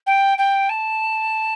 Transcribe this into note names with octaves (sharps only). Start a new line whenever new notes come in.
G5
G5
A5